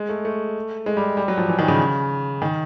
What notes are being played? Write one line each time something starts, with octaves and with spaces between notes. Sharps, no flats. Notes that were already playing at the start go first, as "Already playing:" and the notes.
Already playing: G#3
A3
A3
G#3
G3
G3
F#3
F3
E3
D#3
C#3
D#3